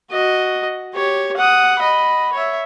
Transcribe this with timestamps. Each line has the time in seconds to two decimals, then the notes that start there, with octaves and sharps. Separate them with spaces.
0.12 F#4 D#5
0.94 G4 C#5
1.37 F#5 D#6
1.80 D#5 B5
2.33 C#5 E5